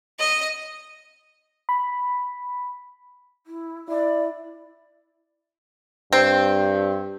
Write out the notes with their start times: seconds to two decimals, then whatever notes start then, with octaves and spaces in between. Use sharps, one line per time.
0.19 D#5
1.69 B5
3.47 E4
3.88 E4 D5
6.13 G2 C4